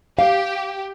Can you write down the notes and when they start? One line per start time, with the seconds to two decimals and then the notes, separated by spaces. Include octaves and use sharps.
0.19 G4 F5